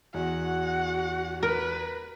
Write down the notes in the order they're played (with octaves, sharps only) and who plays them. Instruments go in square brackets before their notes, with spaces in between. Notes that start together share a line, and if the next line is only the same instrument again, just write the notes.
[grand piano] E2 [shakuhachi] F#4 [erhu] F#5
[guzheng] A#4 [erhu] B4